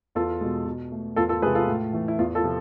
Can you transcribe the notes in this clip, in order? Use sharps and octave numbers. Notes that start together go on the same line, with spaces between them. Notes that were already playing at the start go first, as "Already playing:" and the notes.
E2 F4 A4
B2 G#3
B2
A3
E2 F4 A4
F4 A4
C3 G#3 G#4 B4
F4 A4
A2
E3 A3
E4
E2 F4
F4 A4
C3 F3